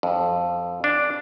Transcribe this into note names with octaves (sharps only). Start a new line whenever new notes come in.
F2
D4